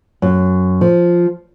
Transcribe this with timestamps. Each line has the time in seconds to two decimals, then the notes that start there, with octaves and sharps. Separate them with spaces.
0.22 F#2
0.81 F3